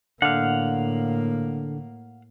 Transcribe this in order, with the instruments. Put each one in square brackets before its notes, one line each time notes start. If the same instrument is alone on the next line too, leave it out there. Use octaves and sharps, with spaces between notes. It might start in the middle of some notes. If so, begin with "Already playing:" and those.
[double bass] A2 A#3 [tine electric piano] D3 [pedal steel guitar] F5 F#5